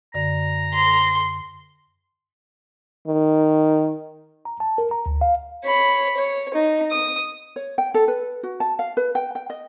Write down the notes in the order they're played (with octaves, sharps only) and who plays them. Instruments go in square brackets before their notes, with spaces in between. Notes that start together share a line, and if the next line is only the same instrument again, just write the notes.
[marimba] F#2 D3 D5 [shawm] A#5
[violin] C6
[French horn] D#3
[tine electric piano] A#5
A5
A#4
A#5
D2
F5
[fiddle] C#5 B5
C#5
D#4
D#6
[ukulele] C#5
G5
A4
B4
F#4
A5
F5
B4
G5
G5
D#5